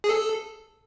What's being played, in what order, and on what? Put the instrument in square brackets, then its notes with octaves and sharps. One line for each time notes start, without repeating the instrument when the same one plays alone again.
[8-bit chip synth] G#4
A4